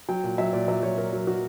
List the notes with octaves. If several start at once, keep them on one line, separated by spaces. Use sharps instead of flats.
F#3 G5
A#2
F#3 E5
A#2 D5
F#3 E5
F#3 C#5
F#3 A#4
F#3
F#3 F#4